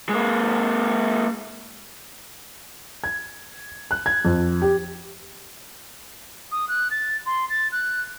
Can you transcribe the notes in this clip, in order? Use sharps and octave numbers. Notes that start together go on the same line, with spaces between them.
G#3 A#3
G#6
F#6
G#6
F2
G4
D#6
F#6
A6
C6
A6
F#6